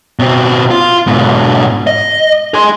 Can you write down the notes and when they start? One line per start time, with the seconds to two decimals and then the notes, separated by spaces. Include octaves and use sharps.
0.19 B2 C4
0.71 F4
1.07 G#2 B2
1.87 D#5
2.54 G#4 C6